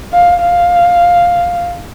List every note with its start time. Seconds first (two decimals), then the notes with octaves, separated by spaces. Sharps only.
0.13 F5
0.41 F5